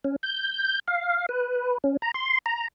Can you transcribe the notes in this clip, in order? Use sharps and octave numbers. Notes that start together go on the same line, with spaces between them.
C#4
G6
F5
B4
C#4
A#5
C6
A#5